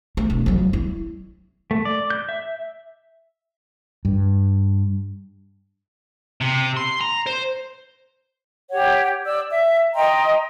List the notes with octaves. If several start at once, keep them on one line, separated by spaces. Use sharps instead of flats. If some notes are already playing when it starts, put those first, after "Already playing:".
A3
E1
F2 F#3
E4
A3
D5
G6
E5
G2
C3
C6
A#5
C5
G4 C#5 F#5
D5 E6
E5
D#5 G5 A#5 C6